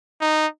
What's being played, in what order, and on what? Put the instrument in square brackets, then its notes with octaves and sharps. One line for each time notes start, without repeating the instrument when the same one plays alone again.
[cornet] D#4